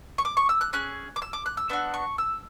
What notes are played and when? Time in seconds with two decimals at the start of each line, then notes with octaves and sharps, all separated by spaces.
0.18 C#6
0.25 D6
0.37 C#6
0.49 E6
0.61 F#6
0.73 C#4 G#4 F#6
1.16 D6
1.22 E6
1.33 D6
1.46 F#6
1.57 E6
1.69 B3 D4 F#4 E6
1.94 C#6
2.18 E6